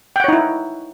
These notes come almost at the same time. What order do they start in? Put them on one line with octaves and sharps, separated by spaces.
G5 F#5 C#5 D#4 E4